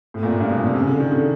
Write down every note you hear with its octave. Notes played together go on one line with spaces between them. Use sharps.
A2
A#2
A2
G2
B2
A#2
C3
C#3
D3
D#3
D3